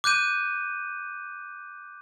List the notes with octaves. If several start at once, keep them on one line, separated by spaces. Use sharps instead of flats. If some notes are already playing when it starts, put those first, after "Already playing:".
D6 F#6 G6 D#7